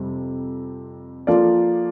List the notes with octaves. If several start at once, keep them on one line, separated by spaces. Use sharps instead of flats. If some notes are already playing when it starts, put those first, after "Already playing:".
Already playing: F2 C3 G3 C4
F3 A#3 F4 A4 D5